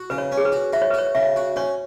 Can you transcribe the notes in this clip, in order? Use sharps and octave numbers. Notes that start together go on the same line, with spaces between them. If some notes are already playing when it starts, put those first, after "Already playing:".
Already playing: F#4
C#3 B4
C#5
C#4
G#4
B4
F#4
F#4 E5
C#5
B4
F#4 C#5
C#3 E5
F#4
C#4 C#5